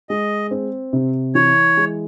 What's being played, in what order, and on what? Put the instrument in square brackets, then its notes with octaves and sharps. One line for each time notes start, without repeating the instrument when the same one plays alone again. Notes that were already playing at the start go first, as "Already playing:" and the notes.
[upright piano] G#3 [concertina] D#5
[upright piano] C4
C3
[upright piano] E3 [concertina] C#5
[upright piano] G#3